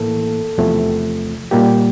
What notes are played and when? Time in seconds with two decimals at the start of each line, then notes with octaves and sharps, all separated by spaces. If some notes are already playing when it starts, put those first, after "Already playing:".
Already playing: A2 E3 A#3 A4
0.58 E2 C3 F3 A3
1.51 A#2 G3 A#3 G4